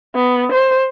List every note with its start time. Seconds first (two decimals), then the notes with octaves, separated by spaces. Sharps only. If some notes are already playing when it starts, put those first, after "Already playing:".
0.15 B3
0.52 C5